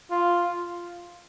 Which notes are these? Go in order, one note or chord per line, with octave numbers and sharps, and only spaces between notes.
F4